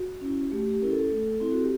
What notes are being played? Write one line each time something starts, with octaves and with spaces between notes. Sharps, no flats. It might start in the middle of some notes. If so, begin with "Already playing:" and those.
Already playing: F#4
C#4 E4
A3 G4
G4
C#4 E4 A#4
A4
A3
C4 E4
F#4
G4